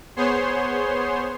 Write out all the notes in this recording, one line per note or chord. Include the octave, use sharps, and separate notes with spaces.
B3 G#4 C5 C#5 C6